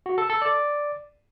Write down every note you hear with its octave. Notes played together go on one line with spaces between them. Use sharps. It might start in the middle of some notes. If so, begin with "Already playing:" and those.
F#4
A4
A4
D5